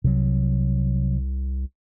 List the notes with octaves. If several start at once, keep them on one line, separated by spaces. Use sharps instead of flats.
C2 C3 F#3